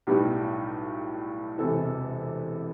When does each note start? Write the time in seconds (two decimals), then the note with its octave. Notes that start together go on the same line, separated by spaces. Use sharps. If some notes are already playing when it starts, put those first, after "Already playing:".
0.07 B1 A2 G3 B3 G4
1.58 E1 E2 C3 E3 A4